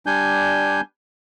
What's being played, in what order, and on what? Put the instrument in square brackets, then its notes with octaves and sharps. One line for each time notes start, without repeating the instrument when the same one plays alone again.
[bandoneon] G3 D4 G#5 G6